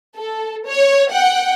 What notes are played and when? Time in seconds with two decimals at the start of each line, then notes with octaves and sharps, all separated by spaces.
0.17 A4
0.67 C#5
1.11 F#5 G5